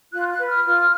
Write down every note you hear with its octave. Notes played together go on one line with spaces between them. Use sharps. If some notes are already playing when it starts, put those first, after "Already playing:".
F4 F#6
F#6
B4
F6
F4